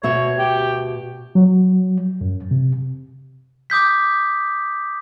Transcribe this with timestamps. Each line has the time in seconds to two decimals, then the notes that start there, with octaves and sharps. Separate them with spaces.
0.03 D2 B2 C#5 E5
0.38 G4
1.35 F#3
2.21 F#2
2.51 C3
3.70 D6 D#6 G6 B6